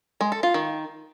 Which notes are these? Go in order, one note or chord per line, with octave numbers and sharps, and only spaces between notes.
G#3
A4
F4
D#3